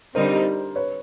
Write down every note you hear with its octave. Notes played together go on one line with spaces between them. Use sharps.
D3 G3 C4 D#4 A#4 C5
B4 C#5